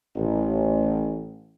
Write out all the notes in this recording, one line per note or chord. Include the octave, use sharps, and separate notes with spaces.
A1